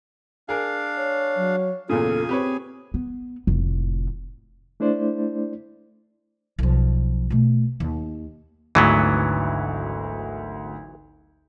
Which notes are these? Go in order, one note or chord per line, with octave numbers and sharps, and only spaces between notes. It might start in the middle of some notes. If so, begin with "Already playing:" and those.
D4 G#4 A#4 F5
C#5
F#3
E2 A#2 C#3 F4 G#4 A4 G#5
C4 G4 B4 C#5
B3
F1 A2
A3 D4 E4 C5 D5
B1 F3
B2 A3
D#2
G#1 D2 E3 F#3 B3